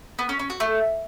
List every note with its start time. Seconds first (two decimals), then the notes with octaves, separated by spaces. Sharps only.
0.19 B3
0.29 C#4
0.39 C#4
0.50 F#4
0.60 A3